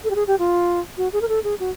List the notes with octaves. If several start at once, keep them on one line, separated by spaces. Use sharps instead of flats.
A4
G4
G#4
G4
F4
F#4
G#4
A#4
A4
G#4
F#4